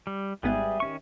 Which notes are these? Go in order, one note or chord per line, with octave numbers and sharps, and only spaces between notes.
G3
G#1 G#2 G3 B3 G4 G#4 E5
D#3 C#4 C#6